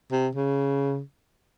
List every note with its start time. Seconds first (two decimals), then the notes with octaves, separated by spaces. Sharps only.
0.12 C3
0.35 C#3